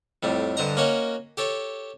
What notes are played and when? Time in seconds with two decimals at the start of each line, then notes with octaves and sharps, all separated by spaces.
0.23 F2 A2 G3
0.57 G2 D3 C5 D#5 A#5
0.77 A#3 C#4 F#4 A#4 C#5 D#5
1.37 G4 A4 C#5